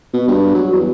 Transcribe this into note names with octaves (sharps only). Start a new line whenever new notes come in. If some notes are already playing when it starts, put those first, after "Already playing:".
B2
G2
F#3
E2